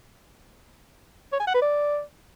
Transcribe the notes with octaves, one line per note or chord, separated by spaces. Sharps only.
C#5
G#5
F#5
B4
D5